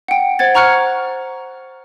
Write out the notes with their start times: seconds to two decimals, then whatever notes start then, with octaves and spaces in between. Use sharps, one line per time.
0.08 F#5 G5
0.39 C5 F#5 G#6 A6
0.55 F#5 A#5 C#6 F6 F#6 C#7